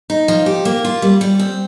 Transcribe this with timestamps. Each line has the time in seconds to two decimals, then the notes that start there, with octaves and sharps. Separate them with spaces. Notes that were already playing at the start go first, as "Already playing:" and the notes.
0.10 D#4
0.28 F3
0.46 G4
0.65 A#3
0.84 F4
1.02 G3
1.21 G3
1.39 C4